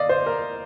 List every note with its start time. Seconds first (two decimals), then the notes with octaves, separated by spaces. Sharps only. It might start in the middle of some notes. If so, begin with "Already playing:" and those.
Already playing: D5 D#5 F5
0.09 C5
0.26 A#4